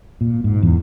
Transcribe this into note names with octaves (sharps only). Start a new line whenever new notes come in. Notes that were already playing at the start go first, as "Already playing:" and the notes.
A#2
G#2
E2